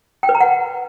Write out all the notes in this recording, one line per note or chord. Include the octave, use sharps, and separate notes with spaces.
G5
B4
A#5
F#5